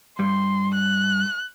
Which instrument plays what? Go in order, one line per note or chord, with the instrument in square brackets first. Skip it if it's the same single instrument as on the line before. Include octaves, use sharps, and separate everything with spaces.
[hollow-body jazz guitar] G2 G3 [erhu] C6
[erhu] F#6